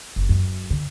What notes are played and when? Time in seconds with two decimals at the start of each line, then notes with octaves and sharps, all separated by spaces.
0.16 F#1
0.29 F#2
0.70 D3